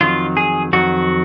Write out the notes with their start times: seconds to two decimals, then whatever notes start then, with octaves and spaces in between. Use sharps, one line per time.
0.01 F2 D#3 F#3 F4
0.37 G#4
0.73 F2 D#3 F#3 F#4